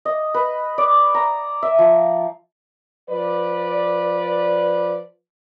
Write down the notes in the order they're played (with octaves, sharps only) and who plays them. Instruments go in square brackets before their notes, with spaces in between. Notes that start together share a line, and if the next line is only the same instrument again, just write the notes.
[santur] D#5
B4
D5
A#5
E5
F3
[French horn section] F3 B4 D5